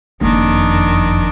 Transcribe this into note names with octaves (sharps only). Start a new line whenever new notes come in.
F#1 F2 D#3 D4